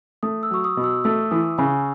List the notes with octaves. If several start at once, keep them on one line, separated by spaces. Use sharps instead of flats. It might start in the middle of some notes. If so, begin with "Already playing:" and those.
A3 D#6
E6
F#3 C#6
D#6
B2
E6
A3 E6
E3 D#6
C#3 G#5